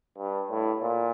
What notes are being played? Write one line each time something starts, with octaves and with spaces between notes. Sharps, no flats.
G2
A2
A#2